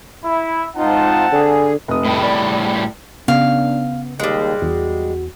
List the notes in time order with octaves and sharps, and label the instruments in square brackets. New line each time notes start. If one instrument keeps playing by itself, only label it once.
[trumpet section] E4
[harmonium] G#2 D#4 F4 [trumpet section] C4 F#5 A5
[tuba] D3 [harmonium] G#4
[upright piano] F1 D#6
[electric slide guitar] A2 G3
[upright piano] D5
[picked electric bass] C#3 [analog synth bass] B3 [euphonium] D4 [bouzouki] F5
[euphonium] D#2 [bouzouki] G3 G#3
[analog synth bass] E2 [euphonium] F#4